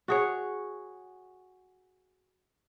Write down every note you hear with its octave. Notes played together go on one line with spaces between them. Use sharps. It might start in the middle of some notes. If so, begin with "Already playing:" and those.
F#4 G#4 C#5